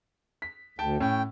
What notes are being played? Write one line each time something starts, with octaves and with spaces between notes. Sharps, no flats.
B6
D2 G5 A5
A2 C#4 G5